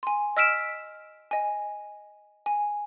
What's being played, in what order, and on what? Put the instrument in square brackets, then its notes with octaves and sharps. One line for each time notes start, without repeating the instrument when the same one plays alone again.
[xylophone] G#5 C6
D#5 E6 F6 B6 D7 E7
D#5 G#5
G#5